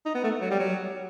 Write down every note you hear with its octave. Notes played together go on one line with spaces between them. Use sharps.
D#4
B3
A3
F#3
G3
F#3